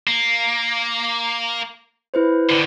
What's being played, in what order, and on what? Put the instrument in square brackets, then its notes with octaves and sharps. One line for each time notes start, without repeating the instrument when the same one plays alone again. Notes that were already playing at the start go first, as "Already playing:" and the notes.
[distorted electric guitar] A#3
[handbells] E4 B4 C5
[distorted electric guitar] D3 D#3